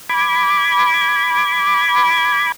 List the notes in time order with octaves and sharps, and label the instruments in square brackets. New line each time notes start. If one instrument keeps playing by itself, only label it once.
[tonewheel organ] B5 D6 G#6